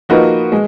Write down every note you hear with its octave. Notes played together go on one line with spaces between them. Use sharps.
F3 A#3 D#4 F#4 B4
G#3